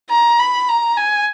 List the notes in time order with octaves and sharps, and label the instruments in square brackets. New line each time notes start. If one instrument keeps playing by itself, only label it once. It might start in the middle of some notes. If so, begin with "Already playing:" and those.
[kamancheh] A#5
B5
A#5
G#5